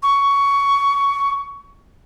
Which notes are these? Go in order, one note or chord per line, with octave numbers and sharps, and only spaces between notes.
C#6